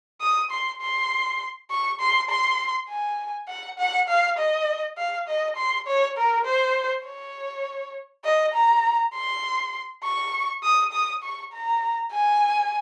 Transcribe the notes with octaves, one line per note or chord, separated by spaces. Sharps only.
D#6
C6
C6
C#6
C6
C6
G#5
F#5
F#5
F5
D#5
F5
D#5
C6
C#5
A#4
C5
C#5
D#5
A#5
C6
C#6
D#6
D#6
C#6
A#5
G#5